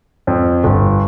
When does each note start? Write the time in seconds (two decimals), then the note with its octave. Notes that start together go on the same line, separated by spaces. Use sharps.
0.27 F2
0.64 G1